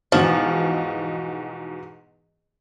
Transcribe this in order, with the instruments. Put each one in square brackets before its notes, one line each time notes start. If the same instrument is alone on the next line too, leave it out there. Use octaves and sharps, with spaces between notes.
[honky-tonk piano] E2 G#2 B2 [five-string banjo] F3